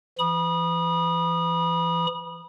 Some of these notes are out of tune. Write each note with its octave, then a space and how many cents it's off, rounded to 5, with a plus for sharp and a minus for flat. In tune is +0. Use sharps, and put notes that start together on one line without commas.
E3 +40 B5 -30 D#6 -25